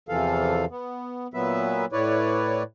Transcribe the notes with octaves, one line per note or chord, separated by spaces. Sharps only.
E2 C3 E3 F3 A4 F5
B3
A#2 F#3 B3 B4 E5
A2 E4 B4 C#5 D5